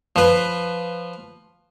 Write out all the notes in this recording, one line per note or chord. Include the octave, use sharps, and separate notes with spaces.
F3 B4